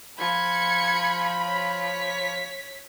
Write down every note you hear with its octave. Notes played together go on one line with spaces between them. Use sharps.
F3 B5 G#6 C#7
C#5 B6